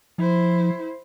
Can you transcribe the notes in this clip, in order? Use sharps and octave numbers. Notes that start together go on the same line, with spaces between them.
F3 E4 C5